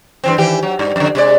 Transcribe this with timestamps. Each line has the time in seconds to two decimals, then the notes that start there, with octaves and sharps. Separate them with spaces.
0.24 G2 E3 C4
0.38 D#3 E3 G4
0.63 F#3
0.79 G2
0.96 F2 D3
1.15 C3 G#3 D5